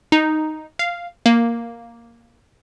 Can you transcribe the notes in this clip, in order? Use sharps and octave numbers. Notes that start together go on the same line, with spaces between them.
D#4
F5
A#3